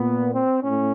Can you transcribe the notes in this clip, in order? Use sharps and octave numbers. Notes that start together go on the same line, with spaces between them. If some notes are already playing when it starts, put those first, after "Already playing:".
Already playing: A#2 B3
C4
A2 C#4